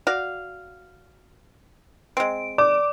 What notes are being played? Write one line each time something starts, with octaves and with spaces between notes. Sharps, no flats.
F#4 D5 F5
G#3 C4 D7
D5 D6